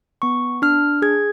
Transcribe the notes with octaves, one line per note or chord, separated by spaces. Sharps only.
B3 C#6
D4 F6
G#4 G#6